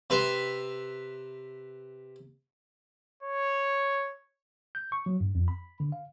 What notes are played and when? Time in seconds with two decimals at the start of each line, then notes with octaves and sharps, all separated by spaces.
0.10 C3 B4 E5 A#5 C6
3.23 C#5
4.75 G6
4.92 C#6
5.06 F#3
5.21 G2
5.35 F2
5.48 B5
5.80 D3
5.92 F5